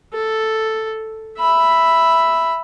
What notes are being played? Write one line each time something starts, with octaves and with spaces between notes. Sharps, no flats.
A4
E5 B5